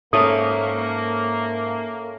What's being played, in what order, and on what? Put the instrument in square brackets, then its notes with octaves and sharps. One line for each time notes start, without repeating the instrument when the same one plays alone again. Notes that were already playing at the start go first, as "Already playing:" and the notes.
[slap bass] G#2 [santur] A3 C#4 E5 [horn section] A#3 [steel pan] D#6